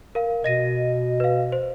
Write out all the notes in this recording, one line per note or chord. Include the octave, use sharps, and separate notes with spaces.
A#4 F5
B2 D#5 A#6 D#7
B4 F5
C5